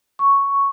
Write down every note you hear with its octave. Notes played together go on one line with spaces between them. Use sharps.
C#6